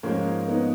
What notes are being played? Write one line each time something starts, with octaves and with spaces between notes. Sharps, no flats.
G#2 F3 G#3 A#3 C#4
B3 D#4